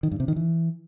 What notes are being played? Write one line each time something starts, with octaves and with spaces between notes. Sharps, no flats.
D#3
G2
C3
D#3
E3